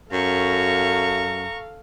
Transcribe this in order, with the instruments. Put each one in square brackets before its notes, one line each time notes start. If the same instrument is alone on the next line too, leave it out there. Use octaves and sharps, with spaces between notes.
[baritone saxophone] F#2 [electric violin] A4 F5 [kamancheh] A#5 C#6